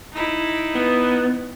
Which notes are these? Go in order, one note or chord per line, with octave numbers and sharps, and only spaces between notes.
D#4 E4
B3